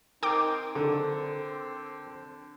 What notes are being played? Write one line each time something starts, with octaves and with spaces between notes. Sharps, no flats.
C4 D#4 A#4 G5 D6
D3 C4